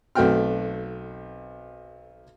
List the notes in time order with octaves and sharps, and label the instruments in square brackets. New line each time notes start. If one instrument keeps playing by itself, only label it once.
[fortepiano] B1 A3 C4 F#4 G5 F6